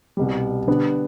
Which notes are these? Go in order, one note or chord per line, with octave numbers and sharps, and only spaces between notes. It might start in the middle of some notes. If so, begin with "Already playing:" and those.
C2 B2 G3
D3 G3 B3 D4